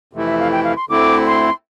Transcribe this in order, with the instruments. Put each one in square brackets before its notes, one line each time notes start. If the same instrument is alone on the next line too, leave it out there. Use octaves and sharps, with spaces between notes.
[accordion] F2 C3 E3 A3 E4
[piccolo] E5
F5
G5
F5
C6
[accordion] D2 D3 A3 C4 E4 [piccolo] D6
[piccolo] C6